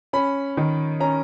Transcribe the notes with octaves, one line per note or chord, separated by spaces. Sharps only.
C#4 B5
D#3
C#4 A#5